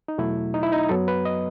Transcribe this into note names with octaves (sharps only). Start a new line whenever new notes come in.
D#4
E2 B2 F#3 A3 E4
D#4
E4
D#4
F#2 F#3 B3 A4
B4
D#5